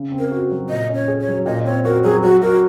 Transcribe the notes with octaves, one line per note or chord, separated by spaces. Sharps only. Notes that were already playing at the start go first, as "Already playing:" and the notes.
Already playing: C#3
C4
A#4
F#4
F#3
A#2 D#5
C#4
C#5
G#4
C#5
F#3
A#2 D#5
C4 C#5
F#4 A#4
F#3 G#4
F#3 F#4
F#4 A#4